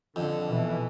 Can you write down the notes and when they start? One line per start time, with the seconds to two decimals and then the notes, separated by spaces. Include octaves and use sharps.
0.16 F2 D3
0.46 B2 E3